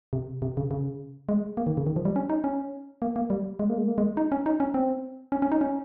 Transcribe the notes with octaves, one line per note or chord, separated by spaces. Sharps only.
C3
C3
C#3
C#3
G#3
A#3
D#3
C#3
D#3
F3
G3
C#4
D#4
C#4
A#3
A#3
G3
G#3
A#3
G#3
A#3
G#3
D#4
C#4
D#4
C#4
C4
C#4
C#4
D#4
C#4